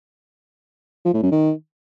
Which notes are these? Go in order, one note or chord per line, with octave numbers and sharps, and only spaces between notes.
F3
A2
F#2
D#3